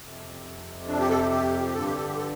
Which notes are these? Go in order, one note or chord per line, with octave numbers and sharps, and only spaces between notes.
F2 C3
D4
G4
A4
G4
G4
G4
G2 D3 A4
G4
A4
G4
A4